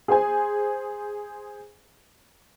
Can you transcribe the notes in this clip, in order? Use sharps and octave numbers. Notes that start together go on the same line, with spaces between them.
G#4 C5 G#5